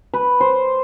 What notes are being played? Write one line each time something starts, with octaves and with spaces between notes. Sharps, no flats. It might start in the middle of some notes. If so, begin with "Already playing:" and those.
B4
C5